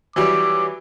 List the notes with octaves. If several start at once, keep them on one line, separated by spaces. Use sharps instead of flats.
E3 F#3 G3 D6